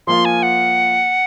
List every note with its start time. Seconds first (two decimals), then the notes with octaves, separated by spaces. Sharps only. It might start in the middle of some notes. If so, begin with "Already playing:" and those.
0.07 F3 A#3 F4 C6
0.25 G#5
0.43 F#5